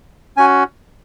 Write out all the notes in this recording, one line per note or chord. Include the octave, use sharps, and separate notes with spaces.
C#4 F#4 G#5